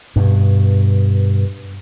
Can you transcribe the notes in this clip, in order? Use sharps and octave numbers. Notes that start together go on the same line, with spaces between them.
G2 B2